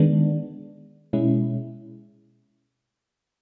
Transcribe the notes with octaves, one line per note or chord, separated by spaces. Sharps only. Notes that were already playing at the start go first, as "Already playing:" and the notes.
Already playing: D#3 G#3 B3 D4
B2 G#3 C#4 E4